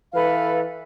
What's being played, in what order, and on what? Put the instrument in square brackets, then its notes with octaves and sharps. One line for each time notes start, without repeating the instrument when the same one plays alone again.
[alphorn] E3 [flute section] A4 B4 F5